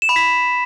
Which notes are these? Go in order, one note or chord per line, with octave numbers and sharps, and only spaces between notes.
E7
B5
B6